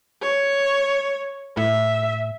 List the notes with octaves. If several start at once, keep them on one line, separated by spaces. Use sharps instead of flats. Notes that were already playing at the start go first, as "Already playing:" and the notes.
C#5
A2 E5